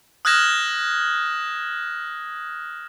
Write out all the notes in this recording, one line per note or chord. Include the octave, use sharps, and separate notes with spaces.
D#6 F6 F#6 G#6 A#6 E7